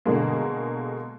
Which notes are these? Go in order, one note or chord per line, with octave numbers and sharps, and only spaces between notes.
B2 D3 G#3 A#3